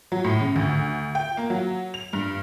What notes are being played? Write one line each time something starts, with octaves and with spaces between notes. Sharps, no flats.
F#3
A2
C#3
D2
G5
A#3
F#3
F7
G2